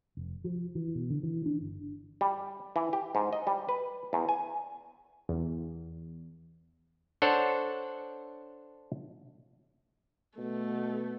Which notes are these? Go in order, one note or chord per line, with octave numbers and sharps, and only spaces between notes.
F1
F3
E3
B2
D3
E3
D4
G1
G3
E3
G4
G#2
D#5
G3
B4
E2
G#5
E2
D4 A4 C5 C#5 F#5
B2 A3